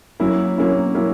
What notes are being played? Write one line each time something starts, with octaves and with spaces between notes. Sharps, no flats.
F#3 A#3 C#4 E4
F#3 A#3 C#4 E4
F#3 A#3 C#4 E4